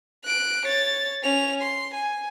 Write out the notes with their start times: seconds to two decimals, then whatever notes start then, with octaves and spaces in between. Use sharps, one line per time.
0.24 F#6 D7
0.66 C#5 A6
1.22 C#4 F7
1.62 C6
1.94 G#5